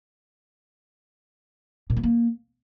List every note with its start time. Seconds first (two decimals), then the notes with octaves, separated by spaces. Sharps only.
1.90 A#2
1.97 A3
2.04 A#3